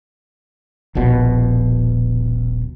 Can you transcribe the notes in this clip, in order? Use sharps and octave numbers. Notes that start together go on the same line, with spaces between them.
D#1 A#1 B2 F3